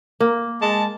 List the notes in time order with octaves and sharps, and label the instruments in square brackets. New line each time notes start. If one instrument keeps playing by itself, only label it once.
[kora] A#3
[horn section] G#3 A5